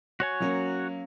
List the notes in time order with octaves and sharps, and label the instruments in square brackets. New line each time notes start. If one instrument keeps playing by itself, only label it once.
[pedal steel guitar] F#4 C#5 G#5
[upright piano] F#3 A#3 C#4